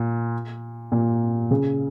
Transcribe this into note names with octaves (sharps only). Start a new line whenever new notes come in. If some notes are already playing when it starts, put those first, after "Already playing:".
Already playing: A#2
A#2
C#3